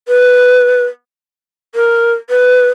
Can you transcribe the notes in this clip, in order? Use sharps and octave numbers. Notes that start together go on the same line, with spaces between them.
B4
A#4
B4